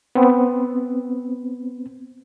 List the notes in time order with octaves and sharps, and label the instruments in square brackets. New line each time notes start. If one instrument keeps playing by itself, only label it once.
[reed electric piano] B3 C4